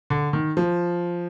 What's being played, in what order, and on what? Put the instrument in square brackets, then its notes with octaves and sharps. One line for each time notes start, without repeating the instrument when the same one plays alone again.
[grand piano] D3
D#3
F3